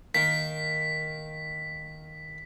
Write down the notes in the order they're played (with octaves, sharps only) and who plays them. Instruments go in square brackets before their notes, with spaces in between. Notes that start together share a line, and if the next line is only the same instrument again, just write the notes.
[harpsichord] D#3 A#3 [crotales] B6